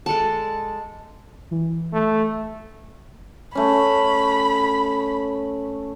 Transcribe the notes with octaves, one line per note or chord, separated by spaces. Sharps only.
G#3 A4 D5 A5
E3
A3
A3 C#4 B5